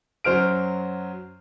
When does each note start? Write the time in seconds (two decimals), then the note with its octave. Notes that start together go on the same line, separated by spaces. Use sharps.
0.24 F#2 F#3 C5 F6 D7